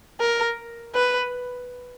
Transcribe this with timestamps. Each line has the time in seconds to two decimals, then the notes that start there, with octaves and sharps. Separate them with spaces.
0.20 A#4
0.95 B4